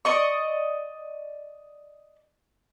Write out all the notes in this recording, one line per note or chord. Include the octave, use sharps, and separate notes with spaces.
D5 D#5 C#6